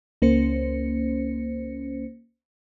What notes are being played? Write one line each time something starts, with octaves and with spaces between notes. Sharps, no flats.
C#2 A#3 C#4 C5 C#7